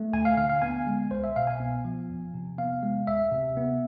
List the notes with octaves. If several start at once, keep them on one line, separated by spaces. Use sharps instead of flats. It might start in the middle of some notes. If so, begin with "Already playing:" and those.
Already playing: A3
D2 G#5
F5
D3 F5
F5
B3 G#5
G#3
C2 C5
E5
B2 F5
G#5
B3
F3
E2
C3
B3 F5
G#3
D2 E5
C3
B3